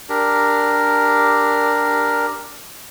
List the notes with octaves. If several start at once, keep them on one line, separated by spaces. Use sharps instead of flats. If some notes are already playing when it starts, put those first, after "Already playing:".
D4 G4 A#4